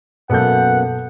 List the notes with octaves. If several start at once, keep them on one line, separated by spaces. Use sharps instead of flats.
F#2 B2 A#3 B3 A4 F#5 G6